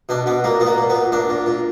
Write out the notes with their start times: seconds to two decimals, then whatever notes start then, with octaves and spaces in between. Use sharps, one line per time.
0.09 B2 D4
0.26 B2 B3
0.44 A#2 A#3
0.60 A#2 B3
0.67 A#3
0.78 A#2
0.90 B3
0.95 A#2
1.12 A#2 D4
1.29 A#2
1.46 A#2